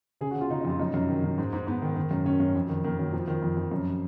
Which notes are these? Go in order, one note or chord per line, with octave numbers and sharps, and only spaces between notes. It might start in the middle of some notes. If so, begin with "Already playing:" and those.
C#3 G#4
F#4
C#3
F4
C#3 D#4
D#4
F2 F4
F#2 D#4
F#2
D#3
F#2
G#2
G#2
G#2 B3
D#3
D#3
F#2
D#3 C#4
F#2
F2
D#3
D#3 A#3
F2 F#3
F2 F3
D#3
F2
F2
F#2